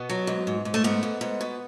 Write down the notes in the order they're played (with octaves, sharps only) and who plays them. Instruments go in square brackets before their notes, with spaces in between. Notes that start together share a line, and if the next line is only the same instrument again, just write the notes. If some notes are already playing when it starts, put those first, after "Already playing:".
Already playing: [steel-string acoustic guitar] B2 B3
F#3
G#2
G#2
G#2
A3
G#2 B3
G#2
G#2
B2